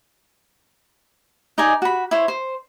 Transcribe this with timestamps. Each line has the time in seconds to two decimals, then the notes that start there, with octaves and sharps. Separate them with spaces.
1.58 D#4 D5 D#5 G#5
1.82 F#4 B5
2.11 E4 C5 C#5
2.28 C5